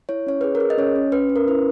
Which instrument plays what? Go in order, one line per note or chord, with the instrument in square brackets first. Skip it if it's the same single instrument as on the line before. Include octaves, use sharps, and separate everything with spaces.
[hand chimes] E4 C#5
C#4 C#5
G#4 B4
A#4
G#4
D#5
C#4 C#5
C#4
C#4 B4
C#4
A#4
E4 B4